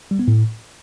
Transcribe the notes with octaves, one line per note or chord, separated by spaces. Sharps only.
G3
B3
A2